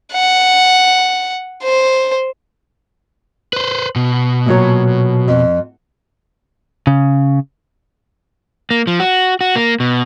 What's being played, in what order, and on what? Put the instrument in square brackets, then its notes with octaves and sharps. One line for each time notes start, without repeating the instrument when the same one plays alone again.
[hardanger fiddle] F#5
C5
[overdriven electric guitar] B4 C5
B2
[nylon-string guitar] A#2 F#3 C#5
F2
[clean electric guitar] C#3
[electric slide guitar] A#3
F3
F#4
F#4
A#3
B2